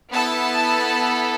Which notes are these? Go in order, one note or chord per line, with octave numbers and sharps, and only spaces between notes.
B3 E4 A4 A5